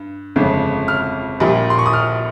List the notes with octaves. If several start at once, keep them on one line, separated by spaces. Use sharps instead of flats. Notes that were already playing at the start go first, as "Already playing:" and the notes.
Already playing: G2
G1 F2 C#3 G#3
F6
A#1 A#2 G3
C6
C#6
D#6
F6